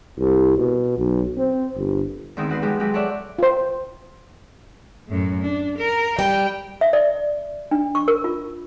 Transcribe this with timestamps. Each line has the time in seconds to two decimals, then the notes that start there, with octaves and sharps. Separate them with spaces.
0.19 C2
0.57 B2
0.98 B1
1.37 C4
1.76 G1
2.37 E2 G#2 D#3 C4 E4 D#6
2.50 G#2 F#4 B4 C6
2.62 F3 G#3 F#4 G4
2.80 F#3 G#3 E4 F#4 G4
2.93 F#4 A4 C#5 D5 E5 F#5
3.39 F4 C5
5.08 F#2 A2
5.41 D4
5.78 A#4
6.19 G3 G5
6.81 E5
6.93 D5
7.71 D4
7.95 C#6
8.08 A#4
8.24 F4